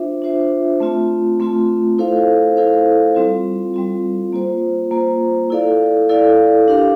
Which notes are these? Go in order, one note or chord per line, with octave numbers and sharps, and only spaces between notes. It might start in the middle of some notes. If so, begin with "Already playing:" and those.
Already playing: D4 F4 C5 E5
D4 F4 C5 E5
A3 C4 F4
A3 C4 F4
E4 A4 C5 F5
E4 A4 C5 F5
G3 C4 F4
G3 C4 F4
A#3 F4 C5
A#3 F4 C5
E4 A4 D5 F5
E4 A4 D5 F5
D4 G4 A#4 F5